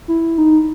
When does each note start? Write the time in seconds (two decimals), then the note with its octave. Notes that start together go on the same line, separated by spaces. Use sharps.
0.08 E4
0.38 D#4